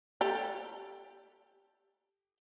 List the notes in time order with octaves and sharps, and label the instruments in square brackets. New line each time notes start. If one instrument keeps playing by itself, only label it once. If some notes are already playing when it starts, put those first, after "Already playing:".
[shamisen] G4 A4